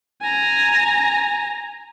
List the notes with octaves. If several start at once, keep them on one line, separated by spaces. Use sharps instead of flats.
G#5 A#5